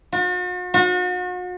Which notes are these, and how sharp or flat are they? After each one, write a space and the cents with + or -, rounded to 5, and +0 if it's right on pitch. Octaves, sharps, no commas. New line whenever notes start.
F#4 -45
F#4 -40